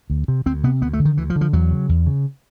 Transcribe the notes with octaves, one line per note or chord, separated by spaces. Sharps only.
D2
C3
D2 C4
C3 B3
D2 B3
A3
D3
D#3
D2 E3
F3
D3
F3
E2 F#3
C#3
E2
C#3